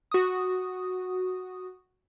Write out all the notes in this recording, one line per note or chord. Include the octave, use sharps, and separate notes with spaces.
F#4 D#6